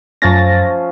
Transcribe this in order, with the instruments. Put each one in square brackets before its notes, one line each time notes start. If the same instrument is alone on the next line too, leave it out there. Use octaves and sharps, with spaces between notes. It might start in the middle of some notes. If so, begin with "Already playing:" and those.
[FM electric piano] F#2 A6 A#6 [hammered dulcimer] F3 A3 C#4